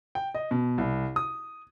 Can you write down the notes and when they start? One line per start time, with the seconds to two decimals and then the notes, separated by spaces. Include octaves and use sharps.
0.15 G5
0.34 D#5
0.51 B2
0.78 C2
1.16 D#6